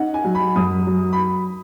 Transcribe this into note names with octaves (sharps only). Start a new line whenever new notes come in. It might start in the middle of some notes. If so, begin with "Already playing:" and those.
Already playing: C#4 D#4 F#5
G#5
F#3
B5
F#2 D#6
F#3
B5